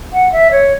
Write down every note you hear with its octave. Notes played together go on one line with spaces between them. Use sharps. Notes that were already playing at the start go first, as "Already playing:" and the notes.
F#5
E5
C#5